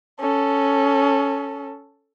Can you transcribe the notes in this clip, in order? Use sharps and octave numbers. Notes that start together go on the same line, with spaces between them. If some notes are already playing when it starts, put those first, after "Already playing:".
C#4 A4